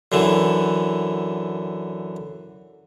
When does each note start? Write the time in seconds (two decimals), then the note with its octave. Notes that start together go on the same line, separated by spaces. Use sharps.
0.12 F#2 D3 E3